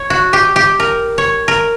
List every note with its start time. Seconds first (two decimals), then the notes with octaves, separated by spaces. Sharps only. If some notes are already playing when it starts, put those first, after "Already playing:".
Already playing: C#5
0.10 F#4
0.33 G4
0.56 G4
0.80 A#4
1.18 C#5
1.48 A#4